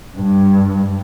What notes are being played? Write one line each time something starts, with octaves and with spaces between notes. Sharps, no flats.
G2